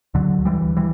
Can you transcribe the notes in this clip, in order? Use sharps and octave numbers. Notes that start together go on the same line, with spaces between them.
D2 D3 F#3
D2
E3 G3
D2
E3 G3